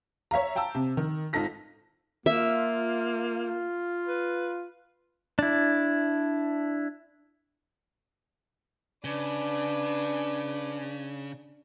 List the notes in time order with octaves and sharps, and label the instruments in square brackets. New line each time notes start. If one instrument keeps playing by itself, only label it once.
[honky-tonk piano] C#5 E5 F5 A#5
F5 G5 A5 A#5 E6
C3
D#3
G#1 D#4 F4 A4 A#6 B6
[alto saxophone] A#3 [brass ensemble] F4 [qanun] E5
[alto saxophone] B4
[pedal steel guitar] D4 E4
[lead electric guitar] C#3 [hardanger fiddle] D4 B4